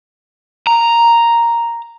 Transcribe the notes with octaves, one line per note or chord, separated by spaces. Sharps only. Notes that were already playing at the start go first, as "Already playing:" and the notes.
A#5